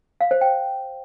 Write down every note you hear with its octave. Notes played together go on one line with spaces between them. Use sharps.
F5
C5
G5